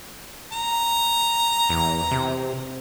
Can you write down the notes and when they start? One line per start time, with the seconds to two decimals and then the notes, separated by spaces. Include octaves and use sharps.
0.52 A#5
1.69 E2
2.11 C3